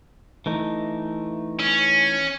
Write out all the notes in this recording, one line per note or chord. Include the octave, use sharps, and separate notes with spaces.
E3 A3 D#4
C#4